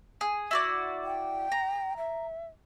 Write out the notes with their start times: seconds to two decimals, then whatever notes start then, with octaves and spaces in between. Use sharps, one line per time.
0.21 G#4
0.51 E4 F#4 D5
1.04 G5
1.52 A#5
1.98 E5